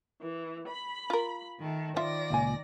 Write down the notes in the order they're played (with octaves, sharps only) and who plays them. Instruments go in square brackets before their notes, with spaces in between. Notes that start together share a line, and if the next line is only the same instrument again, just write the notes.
[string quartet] E3
B5
[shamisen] F4 A#4
[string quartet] D#3 A3
[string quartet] D#3 D5 A#6 [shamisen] F3 F4 E5
[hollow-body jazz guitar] C#2 A#2 G#5